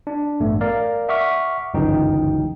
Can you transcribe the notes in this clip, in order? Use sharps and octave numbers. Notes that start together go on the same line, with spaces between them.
D4
A1 G2 A3 B3
A#4 D5 F5
E5 F#5 C#6 D6 F6 B6
G1 C#2 F#2 E3 D#4 G5